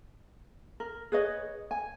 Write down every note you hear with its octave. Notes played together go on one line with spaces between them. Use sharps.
A#4
G#4 B4 C#5 D#5
G#5